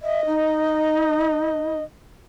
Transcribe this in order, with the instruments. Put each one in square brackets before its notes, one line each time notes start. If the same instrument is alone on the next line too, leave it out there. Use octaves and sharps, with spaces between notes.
[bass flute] D#5 [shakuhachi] E5
[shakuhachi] D#4